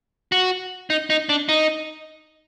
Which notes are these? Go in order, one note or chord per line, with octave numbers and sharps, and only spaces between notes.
F#4
D#4
D#4
D4
D#4